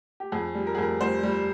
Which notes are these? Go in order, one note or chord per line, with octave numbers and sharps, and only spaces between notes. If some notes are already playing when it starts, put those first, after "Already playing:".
G4
F2 G#4
G3
A#4
G#4
F2 A#4
G3 C5
G3